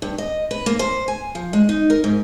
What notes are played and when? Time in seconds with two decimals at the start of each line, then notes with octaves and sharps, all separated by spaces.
0.02 G2
0.18 D#5
0.51 B4
0.66 A#3
0.79 C5
1.08 G#5
1.35 F3
1.53 G#3
1.69 D#4
1.90 A#4
2.04 G#2